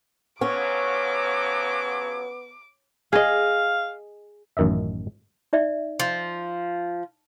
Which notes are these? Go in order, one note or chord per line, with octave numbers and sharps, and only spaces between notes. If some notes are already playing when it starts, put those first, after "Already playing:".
C#3 F3 F#3 B3 C#4 D6
G#4 D#5 F5
A1 F#2 D#3 D#5 E5
D#4 D5 E5
F3